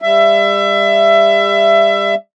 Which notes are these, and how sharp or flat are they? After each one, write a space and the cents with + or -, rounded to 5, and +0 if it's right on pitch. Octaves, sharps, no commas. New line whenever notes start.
G3 +40 E5 +25